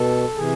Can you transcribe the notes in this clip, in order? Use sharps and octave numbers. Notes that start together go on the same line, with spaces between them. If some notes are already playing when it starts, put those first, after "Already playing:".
Already playing: B2 A4
C3 E3 G#4